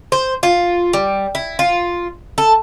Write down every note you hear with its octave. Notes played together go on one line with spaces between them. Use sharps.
C5
F4
G3
E4
F4
A4